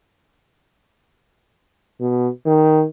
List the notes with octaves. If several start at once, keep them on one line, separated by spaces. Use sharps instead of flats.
B2
D#3